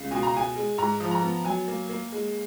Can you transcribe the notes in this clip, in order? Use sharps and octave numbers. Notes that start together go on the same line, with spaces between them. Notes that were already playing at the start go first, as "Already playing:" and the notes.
Already playing: C#2
B2 G#5
A#5
B2 G#5
G#3
G#2 A#5
F3
A#5
B3
F#3 G#5
A#3
A#3
G#3